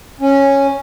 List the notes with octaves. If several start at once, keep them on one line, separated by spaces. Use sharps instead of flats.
C#4